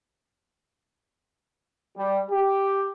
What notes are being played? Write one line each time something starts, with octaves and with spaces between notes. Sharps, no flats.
G3
G4